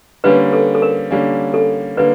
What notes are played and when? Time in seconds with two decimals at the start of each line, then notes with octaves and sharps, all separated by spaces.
0.24 D3 G3 A#3 C#4 B4
0.53 A4
0.75 A4
0.82 A#4
1.11 D3 G3 A#3 C#4
1.54 A4
1.97 D3 G3 A#3 B4